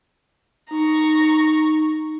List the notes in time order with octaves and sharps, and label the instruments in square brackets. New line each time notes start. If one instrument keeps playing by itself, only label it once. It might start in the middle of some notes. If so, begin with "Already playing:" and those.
[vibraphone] D#4 [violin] A#5 C#6